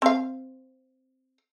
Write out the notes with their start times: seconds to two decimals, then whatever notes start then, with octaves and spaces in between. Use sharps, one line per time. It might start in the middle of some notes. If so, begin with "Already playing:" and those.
0.02 C4 F5